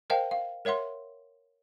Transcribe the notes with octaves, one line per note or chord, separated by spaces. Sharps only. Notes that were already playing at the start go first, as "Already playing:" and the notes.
A#4 C5 D#5 F5 G5 A5
F5
A#4 C#5 E5 F#5 C6